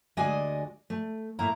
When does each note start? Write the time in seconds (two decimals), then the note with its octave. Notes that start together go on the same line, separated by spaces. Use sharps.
0.17 D2 G#3 F#4 D5 D#5 G#5
0.90 A3
1.39 A2 A3 A#3 A#5